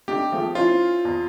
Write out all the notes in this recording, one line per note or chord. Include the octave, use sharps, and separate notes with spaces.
A3 D4 D#4 G4
F3 A3 G#4
C#4 E4 F4 C5
E2